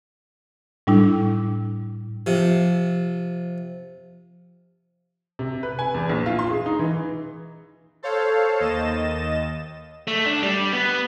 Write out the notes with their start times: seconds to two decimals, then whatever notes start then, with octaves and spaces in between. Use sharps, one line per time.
0.87 A2 G3 D4 E4
2.26 C3 F3
5.39 C3
5.63 B4
5.79 G#5
5.94 E2
6.09 A#1
6.26 F4
6.39 C6
6.50 G#4
6.66 D#4
6.79 E3
8.03 A4 C5 C#5 F5
8.60 D#2 D#5 A6 E7
10.08 A3
10.26 D4
10.43 G3
10.73 B3